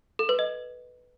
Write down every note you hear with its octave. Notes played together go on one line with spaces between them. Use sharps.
A4
B4
D#5